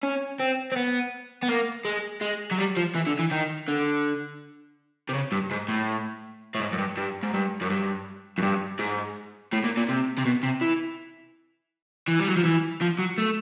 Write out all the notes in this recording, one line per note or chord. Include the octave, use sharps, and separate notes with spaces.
C#4
C4
C4
B3
B3
A#3
G#3
G#3
F#3
G3
F3
E3
D3
E3
D#3
D3
C3
C#3
G2
G#2
A2
A2
G#2
F#2
G2
G2
G#2
G2
F#2
G2
F#2
G2
G#2
A2
A#2
A#2
C3
C3
B2
C3
E3
E3
G3
F#3
F3
E3
F3
F#3
A3